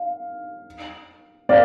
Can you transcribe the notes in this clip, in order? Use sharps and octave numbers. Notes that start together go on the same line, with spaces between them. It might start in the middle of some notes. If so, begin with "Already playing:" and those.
Already playing: F5
D5 F5